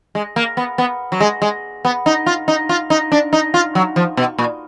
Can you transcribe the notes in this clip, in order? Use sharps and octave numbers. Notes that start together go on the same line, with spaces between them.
G#3
A#3
B3
B3
F#3
G#3
G#3
B3
D#4
F4
D#4
F4
D#4
D4
D#4
F4
F#3
F3
B2
A#2